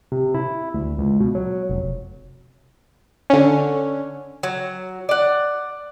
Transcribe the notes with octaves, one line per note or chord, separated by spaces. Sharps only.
C3
E4
D2
C#2
B2
F#3
F1
D3 C#4
F#3
D5 F#5